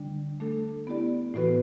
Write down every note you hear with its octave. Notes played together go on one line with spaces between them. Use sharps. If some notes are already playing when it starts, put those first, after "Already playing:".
Already playing: D3 G3 D4
A3 D4 A4
B3 E4 G4 D5
A2 E3 B3 F#4 B4